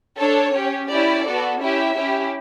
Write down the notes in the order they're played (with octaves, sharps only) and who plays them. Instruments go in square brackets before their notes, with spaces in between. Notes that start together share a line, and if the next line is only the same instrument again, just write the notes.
[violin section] D4 A4 C#5
C#4 G4
C#4 E4 G4 D5
B3 F#4 A4
C#4 E4 G4 E5
C#4 E4 G4